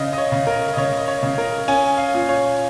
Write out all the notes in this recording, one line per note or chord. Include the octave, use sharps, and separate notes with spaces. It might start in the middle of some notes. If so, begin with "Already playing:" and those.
Already playing: C#3 D#5
D#5
C#5
C#3
A#4
D#5
C#3 C#5
D#5
C#5
C#3
A#4
C#4 G#5
F5
A#2
C#5